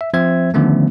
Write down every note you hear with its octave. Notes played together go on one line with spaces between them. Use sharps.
E5
F3 C4 C5 E5 G#6
D3 D#3 F3 A3 B3 C#4